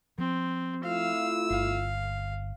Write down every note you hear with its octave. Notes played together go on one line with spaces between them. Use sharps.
F3 C4
A3 E4 F4 F5 E6
G1 F5